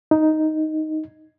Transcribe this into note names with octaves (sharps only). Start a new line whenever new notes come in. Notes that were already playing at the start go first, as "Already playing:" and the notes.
D#4